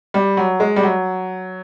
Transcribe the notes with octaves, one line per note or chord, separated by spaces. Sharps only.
G3
F#3
G#3
G3
F#3